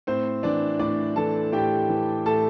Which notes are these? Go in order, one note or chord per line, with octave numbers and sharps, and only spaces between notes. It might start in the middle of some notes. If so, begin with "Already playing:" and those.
A2 C4 C5
E3 D4 D5
A2 D4 D5
E3 A4 A5
A2 G4 G5
E3
A2 A4 A5